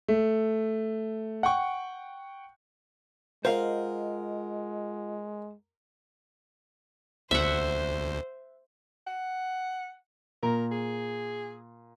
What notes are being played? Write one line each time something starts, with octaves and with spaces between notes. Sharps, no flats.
A3
F#5 G5 C#6
G#3 F4 A#4 C5 D#5 F5 F#5
D2 C5 E5 F#5
F#5
A#2 A#4
G#4